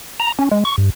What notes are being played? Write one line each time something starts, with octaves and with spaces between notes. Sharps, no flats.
A#5
C#4
G#3
C#6
G2